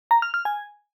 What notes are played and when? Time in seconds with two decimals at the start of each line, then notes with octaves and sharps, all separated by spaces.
0.11 A#5
0.22 F6
0.34 F6
0.45 G#5